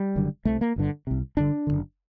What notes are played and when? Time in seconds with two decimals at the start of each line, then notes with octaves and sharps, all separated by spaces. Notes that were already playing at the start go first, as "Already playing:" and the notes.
Already playing: G3
0.16 F#1 F#2 D3
0.45 C2 C3 A3
0.61 A#3
0.76 G1 G2 D3
1.07 C2 C3
1.37 G1 G2 D3 D4
1.67 F#1 F#2 D3